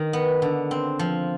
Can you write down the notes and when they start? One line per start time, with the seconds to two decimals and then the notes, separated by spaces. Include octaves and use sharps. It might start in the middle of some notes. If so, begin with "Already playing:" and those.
Already playing: D#3
0.13 B3
0.42 D3
0.71 C4
0.99 F3